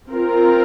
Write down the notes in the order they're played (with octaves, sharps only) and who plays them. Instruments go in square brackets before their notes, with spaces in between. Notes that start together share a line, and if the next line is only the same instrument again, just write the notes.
[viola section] C4 F4 A#4